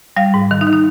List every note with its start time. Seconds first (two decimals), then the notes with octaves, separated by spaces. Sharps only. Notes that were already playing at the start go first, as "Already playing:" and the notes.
0.17 G3 F5
0.34 G#2
0.51 D#3
0.61 D#4
0.67 D#3
0.73 D#4